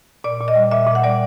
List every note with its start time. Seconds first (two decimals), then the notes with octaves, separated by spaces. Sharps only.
0.24 A#2 D5
0.40 A#2
0.48 D#5
0.55 G3
0.71 A#2 E5
0.87 A#2
0.95 F#5
1.03 G3 D5